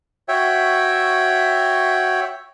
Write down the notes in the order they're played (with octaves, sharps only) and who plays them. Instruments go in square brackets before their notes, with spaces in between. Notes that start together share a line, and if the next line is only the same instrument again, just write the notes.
[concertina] F#4 C#5 E5 G5